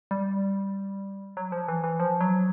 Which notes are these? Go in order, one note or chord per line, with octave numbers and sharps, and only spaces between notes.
G3
F#3
F3
E3
E3
F3
F#3